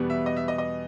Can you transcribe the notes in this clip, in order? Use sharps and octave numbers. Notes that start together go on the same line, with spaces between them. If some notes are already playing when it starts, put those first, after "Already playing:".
Already playing: E2 B2 G3 B3
E5
D#5
E5
D#5
D#5